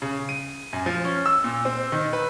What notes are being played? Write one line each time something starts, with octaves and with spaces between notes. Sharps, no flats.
C#3
D#7
F#2
F3
C#4
E6
A#2
C4
D#3
B4